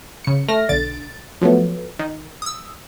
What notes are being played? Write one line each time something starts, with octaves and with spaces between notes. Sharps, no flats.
C#3 C#7
A3 F6 A#6
B1 D3 A6 D7
F3 F#3 A3 B3
D#3
D#6 E6